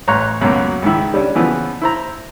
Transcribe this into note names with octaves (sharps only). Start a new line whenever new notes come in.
A1 C#5 A#5 C6 C#6 F#6
C#2 F#2 B2 F#3 A3 A#3
C#2 G#2 D#3 E4
G3 C#4 D4
C#3 E3 F3 B3 C#4
E4 C5 A#5